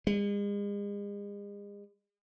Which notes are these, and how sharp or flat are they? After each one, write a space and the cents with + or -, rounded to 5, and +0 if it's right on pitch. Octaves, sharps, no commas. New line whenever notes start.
G#3 -40